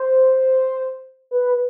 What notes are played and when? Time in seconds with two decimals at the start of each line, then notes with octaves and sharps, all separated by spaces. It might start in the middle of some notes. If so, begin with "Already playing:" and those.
Already playing: C5
1.31 B4